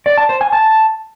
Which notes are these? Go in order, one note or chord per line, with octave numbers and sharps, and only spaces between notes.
D5
A5
C5
G#5
A5